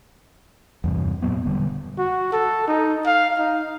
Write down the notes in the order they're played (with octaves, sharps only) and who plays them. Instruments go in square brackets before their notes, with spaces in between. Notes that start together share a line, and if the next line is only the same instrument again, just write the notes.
[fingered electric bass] E2 G2 C3
F#2 A#2 F#3 B3
E1 D3 G3
[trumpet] F#4
A4
D#4
F5
D#4